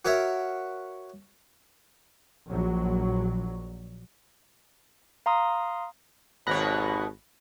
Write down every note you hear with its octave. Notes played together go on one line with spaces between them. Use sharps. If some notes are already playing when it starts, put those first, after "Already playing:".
F#4 A#4 C#5 E5 F#5
A#1 F#3
F5 A#5 C6 D#6
G#1 D#2 B2 C#5 B5 F#6 A#6